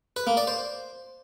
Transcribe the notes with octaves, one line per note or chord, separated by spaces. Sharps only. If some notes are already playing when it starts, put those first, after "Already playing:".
B4
A#3
D5
C5